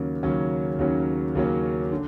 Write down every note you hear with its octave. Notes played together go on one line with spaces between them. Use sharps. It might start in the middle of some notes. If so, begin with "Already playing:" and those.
Already playing: D#2 C#3 F#3 A#3 C#4
D#2 C#3 F#3 A#3 C#4
D#2 C#3 F#3 A#3 C#4
D#2 C#3 F#3 A#3 C#4
D3